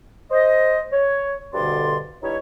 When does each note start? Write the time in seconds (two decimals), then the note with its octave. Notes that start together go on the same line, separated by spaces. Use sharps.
0.31 C5 D#5
0.92 C#5
1.54 D2 G2 B2 D3 D5 C6
2.23 G2 D#4 E4 C#5